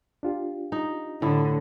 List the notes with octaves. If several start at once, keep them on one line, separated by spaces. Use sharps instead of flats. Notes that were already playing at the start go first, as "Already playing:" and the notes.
D4 F4 G4
D#4
A2 D3 E4